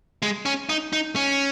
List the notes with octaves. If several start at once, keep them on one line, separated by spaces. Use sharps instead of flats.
G#3
C#4
D#4
D#4
C#4